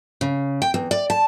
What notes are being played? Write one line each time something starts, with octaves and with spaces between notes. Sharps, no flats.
C#3
G5
E2
D5
A5